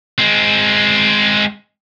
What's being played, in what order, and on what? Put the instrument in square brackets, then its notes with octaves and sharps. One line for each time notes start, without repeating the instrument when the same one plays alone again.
[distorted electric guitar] G#3 C4